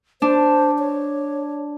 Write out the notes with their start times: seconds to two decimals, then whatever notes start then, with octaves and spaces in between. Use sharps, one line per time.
0.22 D4 C5
0.79 C#5